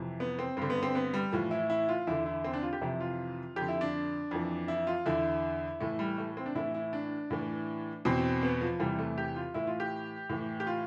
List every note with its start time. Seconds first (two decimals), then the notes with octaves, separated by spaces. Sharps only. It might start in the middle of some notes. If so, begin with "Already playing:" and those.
Already playing: F2 C3 E3
0.20 B3
0.39 C4
0.57 G2 D3 C4
0.70 B3
0.83 C4
0.95 B3
1.14 G3
1.32 A2 E3 F3
1.51 E4
1.70 E4
1.89 F4
2.07 E2 D3 E4
2.26 E4
2.44 C4
2.53 D4
2.63 F4
2.73 G4
2.82 F2 C3 E3 E4
3.00 F4
3.56 F2 D3 G4
3.68 E4
3.81 D4
4.31 F2 E3
4.68 E4
4.87 F4
5.05 E2 D3 E4
5.80 A2 E3 A3
5.99 G3
6.18 A3
6.37 C4
6.46 D4
6.55 A2 E3 E4
6.74 E4
6.93 D4
7.31 A2 E3
8.05 E2 B2 C4
8.43 B3
8.61 F3
8.79 E2 C3 E3 G3
8.99 A3
9.18 G4
9.36 F4
9.54 A2 E3 E4
9.67 F4
9.80 G4
10.29 A2 E3
10.60 G4
10.67 F4